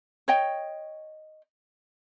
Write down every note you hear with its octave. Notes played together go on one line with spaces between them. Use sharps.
C#5 D#5 G5